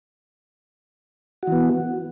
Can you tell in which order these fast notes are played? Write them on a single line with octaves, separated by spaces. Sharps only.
F#4 E3 B3